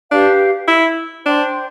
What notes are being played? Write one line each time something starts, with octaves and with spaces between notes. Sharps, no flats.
D4 G4 B4 F5
E4
D4 C5 G5 C6